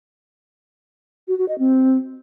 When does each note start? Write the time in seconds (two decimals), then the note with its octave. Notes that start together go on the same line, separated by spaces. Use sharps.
1.28 F#4
1.38 F#4
1.48 D#5
1.59 C4